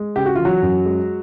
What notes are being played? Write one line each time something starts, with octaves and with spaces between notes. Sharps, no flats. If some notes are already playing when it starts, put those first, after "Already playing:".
Already playing: G#3
C#3 G4
F#4
E3 F4
F#3 F#4
F#2
G#3